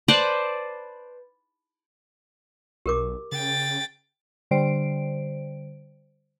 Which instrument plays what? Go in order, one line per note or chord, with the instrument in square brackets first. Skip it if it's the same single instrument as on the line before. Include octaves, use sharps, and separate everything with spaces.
[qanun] B4 C5 D5 A5
[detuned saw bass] B1 [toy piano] G4 A#4 D6
[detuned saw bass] C#3 [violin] G5 A6
[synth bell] D3 G3 C5 D7